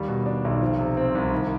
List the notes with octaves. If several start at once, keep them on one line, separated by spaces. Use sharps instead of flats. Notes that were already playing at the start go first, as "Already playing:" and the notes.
Already playing: D#2 G3
B2
D4
B1
F3
C3
C4
C2
D#3